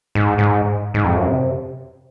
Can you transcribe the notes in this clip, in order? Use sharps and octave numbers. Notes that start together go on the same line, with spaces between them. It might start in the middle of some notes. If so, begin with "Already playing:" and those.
G#2
G#2
G#2
F2
F#2
C3